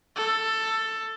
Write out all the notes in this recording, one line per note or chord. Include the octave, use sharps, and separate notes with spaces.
A4